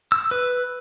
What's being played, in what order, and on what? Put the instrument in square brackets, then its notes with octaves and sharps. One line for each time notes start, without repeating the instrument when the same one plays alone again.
[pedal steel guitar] E6
B4